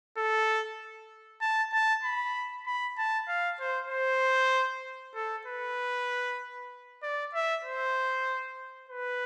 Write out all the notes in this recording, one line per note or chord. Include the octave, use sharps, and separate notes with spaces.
A4
A5
A5
B5
B5
A5
F5
C5
C5
A4
B4
D5
E5
C5
B4